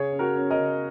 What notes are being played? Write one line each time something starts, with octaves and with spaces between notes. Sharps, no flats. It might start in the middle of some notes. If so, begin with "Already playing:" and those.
Already playing: C#3 G#4 C#5
C#4
F#4 A#4
C#4
A#4 D#5
C#3